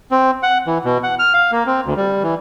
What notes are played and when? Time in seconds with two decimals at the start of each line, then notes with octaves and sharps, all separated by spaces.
0.11 C4
0.43 F#5
0.67 E3
0.85 B2
1.03 F#5
1.19 F6
1.34 F5
1.52 A#3
1.66 C4
1.86 D2
1.97 G3
2.23 E3